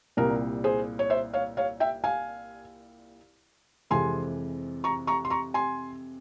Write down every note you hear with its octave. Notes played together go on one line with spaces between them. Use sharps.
C2 A#2 G3 A#4
G#4 C5
C#5
C5 E5
C#5 F5
C#5 F5
E5 G5
F5 G#5
F2 C3 E3 G#3 G#5 C6
A#5 C#6
A#5 C#6
C6
A#5 C#6
G#5 C6